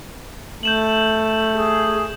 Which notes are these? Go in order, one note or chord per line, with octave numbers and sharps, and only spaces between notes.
A3 G6 E7 F#7
G#4